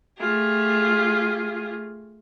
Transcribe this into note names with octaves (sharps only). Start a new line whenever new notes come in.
A3 F4 G4 G#4